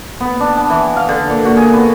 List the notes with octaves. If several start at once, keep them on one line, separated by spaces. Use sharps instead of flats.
B3
D4
A5
E3
F5
D3
A#2
F#4
G#4
B3